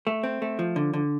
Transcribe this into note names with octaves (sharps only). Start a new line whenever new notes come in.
A3
C4
A3
F3
D3
D3